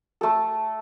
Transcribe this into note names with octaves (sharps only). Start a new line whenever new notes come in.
A3 A4